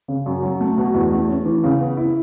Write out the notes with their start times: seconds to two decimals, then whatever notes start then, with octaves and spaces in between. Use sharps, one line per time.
0.08 C#3
0.26 F#2
0.43 F#3
0.61 A3
0.78 B2
0.94 E2
1.12 A3
1.29 C#4
1.45 E3
1.64 C#3
1.80 B3
1.97 E4